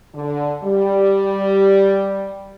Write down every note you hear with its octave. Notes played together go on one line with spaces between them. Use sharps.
D3
G3